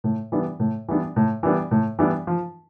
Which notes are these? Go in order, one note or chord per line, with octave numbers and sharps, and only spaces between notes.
A2
E3 G3 B3 D4
A2
E3 G3 B3 D4
A2
E3 G3 B3 D4
A2
E3 G3 B3 D4
F3